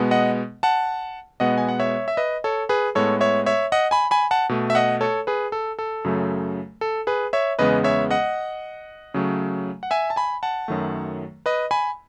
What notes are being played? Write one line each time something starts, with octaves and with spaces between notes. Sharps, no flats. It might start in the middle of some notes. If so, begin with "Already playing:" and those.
Already playing: B2 G#3 B3
D#5 F#5
F#5 A5
B2 G#3 B3 D#5 F#5
G#5
F#5
C#5 E5
E5
B4 D#5
A4 C#5
G#4 B4
A2 G#3 B3 A4 C#5
C#5 E5
C#5 E5
D#5 F#5
G#5 B5
G#5 B5
F#5 A5
B2 A3
E5
D#5 F#5
A4 C#5
G#4 B4
A4
A4
F#2 C#3 F#3 A3
A4
G#4 B4
C#5 E5
E2 C#3 G#3 B3 B4 D#5
C#5 E5
D#5 F#5
C#3 F#3 A3
F#5
E5 G#5
A5
G#5 B5
F#5 A5
F#2 D#3 F#3 A3
B4 D#5
G#5 B5